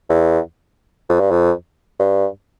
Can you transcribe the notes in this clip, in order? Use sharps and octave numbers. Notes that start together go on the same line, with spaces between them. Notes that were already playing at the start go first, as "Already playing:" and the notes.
E2
F2
G2
F2
G2